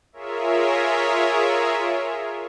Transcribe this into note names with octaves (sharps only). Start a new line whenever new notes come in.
F4 G#4 A#4 C#5 E5